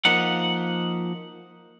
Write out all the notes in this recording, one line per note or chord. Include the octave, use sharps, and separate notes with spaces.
F3 A#3 D#4 F#5